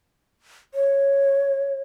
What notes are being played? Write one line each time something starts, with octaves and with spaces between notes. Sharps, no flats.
C#5